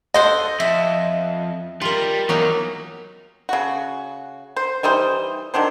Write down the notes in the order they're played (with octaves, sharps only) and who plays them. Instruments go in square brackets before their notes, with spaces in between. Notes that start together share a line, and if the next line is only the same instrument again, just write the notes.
[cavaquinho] A4 C5 F#5 [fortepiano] D#5
[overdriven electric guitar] F2 [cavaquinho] E5
[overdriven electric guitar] G3 [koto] F4 A#4
[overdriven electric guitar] E2 [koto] F#3 A#3 D#4
[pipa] C#3 F#4
C5
E3 G3 D#4 C5
D#3 F#3 D4 C5